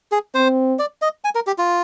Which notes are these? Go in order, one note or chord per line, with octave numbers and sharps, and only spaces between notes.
G#4
C4 C5
D5
D#5
G#5
A#4
G4
F4